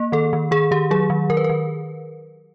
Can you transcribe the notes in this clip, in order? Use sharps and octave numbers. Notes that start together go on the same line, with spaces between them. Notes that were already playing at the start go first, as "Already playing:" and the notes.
Already playing: A#3
D#3 A4
D#3
D#3 G#4
D#3 G4
F#3 G#4
D#3
D#3 A#4
B4
D#3 A#4